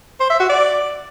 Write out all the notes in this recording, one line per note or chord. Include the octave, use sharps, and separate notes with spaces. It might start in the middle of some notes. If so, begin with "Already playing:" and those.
C5
E5
F#4
D5